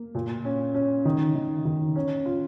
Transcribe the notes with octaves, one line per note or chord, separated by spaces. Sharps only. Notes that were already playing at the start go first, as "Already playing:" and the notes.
Already playing: A#3
A#2
C#4
C#4
D#3
D#3
D#3
C#4
F4